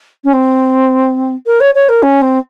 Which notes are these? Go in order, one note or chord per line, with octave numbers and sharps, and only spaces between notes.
C#4
C4
A#4
C#5
C#5
A#4
C#4
C4